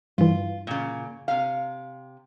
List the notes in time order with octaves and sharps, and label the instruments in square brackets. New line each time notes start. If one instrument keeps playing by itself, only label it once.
[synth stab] G2 E3 [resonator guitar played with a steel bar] F4
[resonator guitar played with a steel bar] A#2 C#3
C3 F5